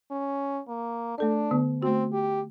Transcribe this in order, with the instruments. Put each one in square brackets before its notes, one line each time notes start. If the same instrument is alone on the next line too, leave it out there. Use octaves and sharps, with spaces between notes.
[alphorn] C#4
A#3
[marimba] A3 A4 D5 [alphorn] D4
[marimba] D3 B3
[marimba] A3 F#4 [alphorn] C4
[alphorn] G4